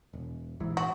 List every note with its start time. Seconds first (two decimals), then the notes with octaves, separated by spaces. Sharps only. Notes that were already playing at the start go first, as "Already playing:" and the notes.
0.13 E1
0.60 A#1 G#2 E3
0.77 F#4